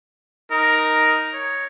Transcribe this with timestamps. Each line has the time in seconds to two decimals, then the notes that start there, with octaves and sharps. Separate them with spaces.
0.51 D#4 A#4
1.33 C#5